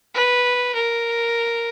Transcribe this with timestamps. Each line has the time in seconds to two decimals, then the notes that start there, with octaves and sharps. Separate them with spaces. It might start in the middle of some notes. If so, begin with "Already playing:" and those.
0.14 B4
0.75 A#4